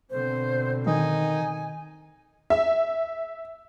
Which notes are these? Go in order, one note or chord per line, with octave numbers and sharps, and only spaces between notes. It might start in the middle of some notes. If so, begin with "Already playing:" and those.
B2 D3 C4 C5
D#3 D#4 G#5
E5